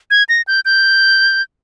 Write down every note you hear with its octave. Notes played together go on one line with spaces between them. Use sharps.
G#6
A#6
G6
G6